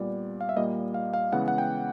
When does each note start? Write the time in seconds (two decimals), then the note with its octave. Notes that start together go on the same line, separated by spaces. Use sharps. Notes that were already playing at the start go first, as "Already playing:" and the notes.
Already playing: A#2 G3 B3 D5
0.41 F5
0.49 E5
0.56 A#2 G3 A#3 D#5
0.94 F5
1.13 F5
1.32 C#3 E3 G#3 B3 F#5
1.48 F#5
1.58 G5